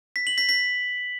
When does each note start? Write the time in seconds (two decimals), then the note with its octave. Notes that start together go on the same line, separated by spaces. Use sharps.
0.16 B6
0.27 F#7
0.38 B6
0.49 B6